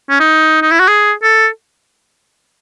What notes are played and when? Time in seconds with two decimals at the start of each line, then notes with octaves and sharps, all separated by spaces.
0.10 C#4
0.20 D#4
0.62 D#4
0.71 E4
0.80 F#4
0.88 G#4
1.23 A4